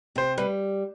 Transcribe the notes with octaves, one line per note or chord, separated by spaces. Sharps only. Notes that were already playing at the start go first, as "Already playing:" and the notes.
C3 C5
G3 B4